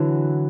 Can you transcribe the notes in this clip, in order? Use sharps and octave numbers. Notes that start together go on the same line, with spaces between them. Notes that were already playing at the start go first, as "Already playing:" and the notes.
Already playing: D3 E3 F#3